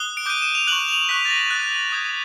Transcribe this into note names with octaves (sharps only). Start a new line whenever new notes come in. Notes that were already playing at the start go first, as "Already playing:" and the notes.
Already playing: D#6 F#6 G7
D7
D6 G6 D#7
E7
F7
C#6 F#6 F#7
F7
C#6 F#6 B6
A6
A#6
D#6 F#6 A6
A6
D#6 G6 G#6